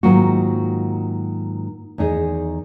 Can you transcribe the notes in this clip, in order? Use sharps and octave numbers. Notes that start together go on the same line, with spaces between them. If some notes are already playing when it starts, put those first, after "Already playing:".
G#2 D#3 F#3 A#3 F4 F#4
E2 D#3 D#4 G#4